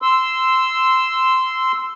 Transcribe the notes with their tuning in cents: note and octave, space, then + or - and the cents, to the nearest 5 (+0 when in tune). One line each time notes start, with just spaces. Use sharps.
C6 -10 E6 +0